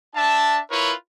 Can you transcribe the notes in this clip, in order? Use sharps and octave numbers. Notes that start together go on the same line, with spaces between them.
D4 E5 A5
E4 F4 A#4 B4 C#5